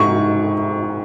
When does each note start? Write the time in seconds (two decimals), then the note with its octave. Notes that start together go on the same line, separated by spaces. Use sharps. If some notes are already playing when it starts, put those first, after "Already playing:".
Already playing: G#2 C#6